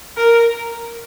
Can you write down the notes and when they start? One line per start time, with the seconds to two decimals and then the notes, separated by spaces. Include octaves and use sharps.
0.17 A#4